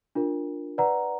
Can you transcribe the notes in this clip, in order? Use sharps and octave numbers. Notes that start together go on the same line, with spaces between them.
D4 F4 A#4
B4 D5 F#5 A#5